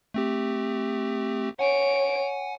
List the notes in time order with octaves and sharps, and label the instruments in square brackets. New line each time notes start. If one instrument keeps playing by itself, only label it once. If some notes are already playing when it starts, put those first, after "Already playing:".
[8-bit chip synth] A3 C4 G4
[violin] C#5 D7 [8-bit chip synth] F#5 G#5